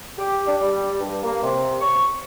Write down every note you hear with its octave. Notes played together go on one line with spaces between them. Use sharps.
G4
D4
G3
G2
A#3
C3
C#6